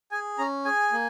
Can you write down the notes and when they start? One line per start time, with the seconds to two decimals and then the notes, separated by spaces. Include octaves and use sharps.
0.11 G#4 G#5
0.38 C#4 A#5
0.65 G#4 G#5
0.92 A#3